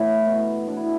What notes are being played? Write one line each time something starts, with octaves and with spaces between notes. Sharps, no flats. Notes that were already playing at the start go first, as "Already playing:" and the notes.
Already playing: A2 E3 A3 B3 E4 A4 B4
B2
B2 D4
E4